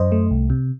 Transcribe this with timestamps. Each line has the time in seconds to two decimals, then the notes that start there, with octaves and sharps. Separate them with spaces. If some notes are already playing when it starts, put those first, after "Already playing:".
Already playing: F#2 C5 D#5
0.12 A3
0.31 C2
0.50 C3